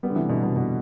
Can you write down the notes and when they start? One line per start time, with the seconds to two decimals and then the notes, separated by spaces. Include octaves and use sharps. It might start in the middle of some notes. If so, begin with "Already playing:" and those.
0.03 G3 B3
0.10 D3
0.16 C3 E3
0.29 B2 D3
0.43 B2
0.56 B2